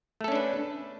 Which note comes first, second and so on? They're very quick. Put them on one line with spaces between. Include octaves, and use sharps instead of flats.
A3 A4 C#4 D4 B4